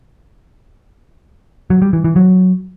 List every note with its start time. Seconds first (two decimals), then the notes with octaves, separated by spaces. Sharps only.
1.70 F#3
1.82 G3
1.93 E3
2.04 E3
2.16 F#3